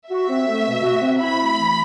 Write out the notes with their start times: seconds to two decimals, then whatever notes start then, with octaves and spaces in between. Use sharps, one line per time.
0.11 F#4 E5
0.30 C4
0.47 A3
0.66 B2
0.83 F#4
1.02 C4
1.20 E4 B5
1.38 A3
1.56 E3